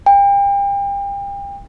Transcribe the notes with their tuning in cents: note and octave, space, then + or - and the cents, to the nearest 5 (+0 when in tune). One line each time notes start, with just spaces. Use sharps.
G5 +35